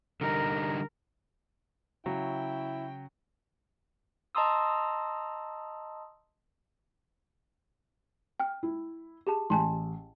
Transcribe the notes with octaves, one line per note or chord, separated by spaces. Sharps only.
D3 G3 D#4 A#4
C#3 F#3 E4 G5
D#5 A5 A#5 C6 D#6 E6
G5 F6
E4
G4 G#4 A5
A1 G#5 A5 C6